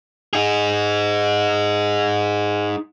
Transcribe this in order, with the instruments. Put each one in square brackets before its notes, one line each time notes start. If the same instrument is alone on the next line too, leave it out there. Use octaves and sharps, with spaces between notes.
[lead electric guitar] D#4 G#4